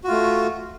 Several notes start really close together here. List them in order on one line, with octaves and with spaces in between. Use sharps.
F#4 F4 A3